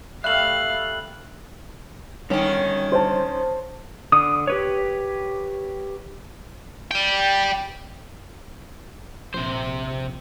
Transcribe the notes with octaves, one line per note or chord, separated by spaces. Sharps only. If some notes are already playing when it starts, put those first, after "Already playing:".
G3 A3 A4 E5 F5 F#6 F#7
D3 D#3 G3 C#4 C#5
C5 A5
D3 D#6
G4 B4 C#5
D5 G5
A#1 C3 C5